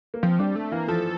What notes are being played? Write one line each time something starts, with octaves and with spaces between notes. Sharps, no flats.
A#3
F3 C4
G3 D4
A3
E3 A#3
F3 A4